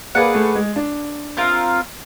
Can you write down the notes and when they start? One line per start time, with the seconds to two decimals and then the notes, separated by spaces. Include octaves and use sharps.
0.15 A#3 G#4 B4 D5 F#5
0.35 A3
0.55 G#3
0.76 D4
1.37 C4 F4 A#4